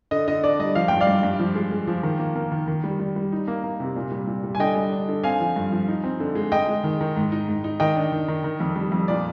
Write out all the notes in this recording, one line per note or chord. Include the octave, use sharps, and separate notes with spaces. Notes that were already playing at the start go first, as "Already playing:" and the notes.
D3 D#5
D3 D#5
D4 D5
G3 D#5
F3 F5
G2 G5
D5 F5
G2
G2
F3
G#3
G#3
F3
D#3
A#3
A#3
D#3
D#3
G3
G3
G3
D#4
A#3
A#3
C3
A#2
G3
A#2
G3
G#5
D3 D#5 G5
G3
D4
D3
C4 F5 G#5
F3
G2
F3
D#4
C4
D3
G#3
G#3 D#5 G5
G#3
D#3
D#3
G#2
D#4
G#2
D#4
D#3 D#5 G5
D4
D#3
D#3
D#3
F2
G3
F2
A#2 D5